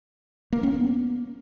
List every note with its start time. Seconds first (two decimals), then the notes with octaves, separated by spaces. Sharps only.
0.53 A#3
0.63 C#4
0.74 B3